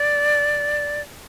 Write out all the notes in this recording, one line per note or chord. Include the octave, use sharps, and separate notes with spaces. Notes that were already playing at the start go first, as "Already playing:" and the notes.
Already playing: D5